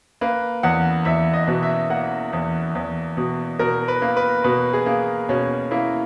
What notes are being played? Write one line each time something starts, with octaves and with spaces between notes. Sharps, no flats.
A#3 B4
E2 F#5
E2 E5
D#5
B2
E5
A#3 F#5
E2
E2
B2
B2 A#4
B4
A#3
B4
B2 B4
G#4
A#3
B2 C#4
A#3 E4